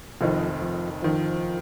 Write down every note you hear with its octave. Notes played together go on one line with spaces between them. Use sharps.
F1 F2 D#3 F3
F3
D#3 F3